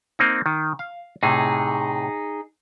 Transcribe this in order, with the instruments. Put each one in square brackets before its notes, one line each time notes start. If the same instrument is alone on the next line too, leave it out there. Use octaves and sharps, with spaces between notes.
[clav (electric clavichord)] A#3 C4 D#4
D#3
F5
[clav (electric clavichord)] A2 C3 [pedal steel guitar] D#4 G#4